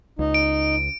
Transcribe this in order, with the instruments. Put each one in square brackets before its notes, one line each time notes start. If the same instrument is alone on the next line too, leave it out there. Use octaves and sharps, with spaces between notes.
[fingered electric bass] C#2 [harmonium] D#4
[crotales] D7